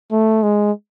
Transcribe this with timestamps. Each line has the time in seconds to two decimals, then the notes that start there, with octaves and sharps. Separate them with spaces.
0.12 A3
0.43 G#3